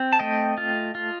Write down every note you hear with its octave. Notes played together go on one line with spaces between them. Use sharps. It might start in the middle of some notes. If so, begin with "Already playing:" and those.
Already playing: C4
A5
A3 D#5 G5
F4
F4